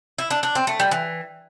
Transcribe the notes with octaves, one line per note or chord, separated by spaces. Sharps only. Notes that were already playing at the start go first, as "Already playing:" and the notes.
E4
D4
D4
C4
A3
G3
E3